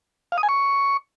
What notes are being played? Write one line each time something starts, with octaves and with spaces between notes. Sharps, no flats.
F5
D#6
G#5
C#6